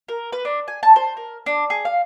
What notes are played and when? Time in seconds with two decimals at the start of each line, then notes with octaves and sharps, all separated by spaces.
0.08 A#4
0.32 B4
0.45 D4
0.68 G#5
0.83 A5
0.96 C5
1.17 A#4
1.46 D4
1.70 G#4
1.85 F5